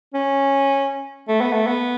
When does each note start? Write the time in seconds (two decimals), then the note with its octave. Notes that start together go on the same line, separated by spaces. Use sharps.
0.14 C#4
1.28 A3
1.41 B3
1.53 A3
1.66 B3